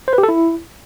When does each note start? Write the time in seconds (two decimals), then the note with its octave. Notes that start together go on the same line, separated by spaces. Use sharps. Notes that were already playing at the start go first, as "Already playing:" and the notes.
0.08 C5
0.13 B4
0.18 G4
0.23 A4
0.29 E4